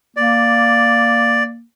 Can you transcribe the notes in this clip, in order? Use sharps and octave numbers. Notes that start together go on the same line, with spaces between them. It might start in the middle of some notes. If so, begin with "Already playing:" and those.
A#3 D5